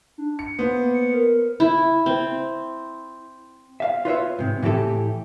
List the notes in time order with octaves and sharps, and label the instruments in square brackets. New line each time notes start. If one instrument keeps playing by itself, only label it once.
[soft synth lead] D4
[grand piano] C#7
[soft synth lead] A#3 [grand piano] B3 C5
[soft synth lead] C#7
A#4
[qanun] E4
C4
[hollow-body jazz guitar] E5 F5
F4 B4 C#5 E5
G#2 C3
A2 E3 E4 G4 A4